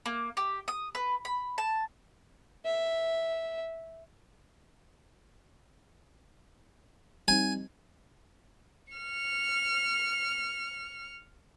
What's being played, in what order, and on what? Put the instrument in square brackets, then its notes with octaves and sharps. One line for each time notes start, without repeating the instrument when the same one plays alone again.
[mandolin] A#3
G4
D#6
B4
B5
A5
[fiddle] E5
[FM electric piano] G3 C4 D#4 [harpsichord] G#5
[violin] F6 C#7